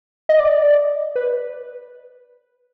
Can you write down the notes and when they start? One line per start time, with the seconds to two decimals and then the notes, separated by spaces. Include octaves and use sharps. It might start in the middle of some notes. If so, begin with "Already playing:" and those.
0.29 D#5
0.40 D5
1.15 B4